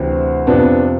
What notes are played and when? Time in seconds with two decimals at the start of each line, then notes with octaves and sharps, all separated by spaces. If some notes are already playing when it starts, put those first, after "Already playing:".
Already playing: D2 C3 E3 C4
0.47 F2 C3 F3 B3 D4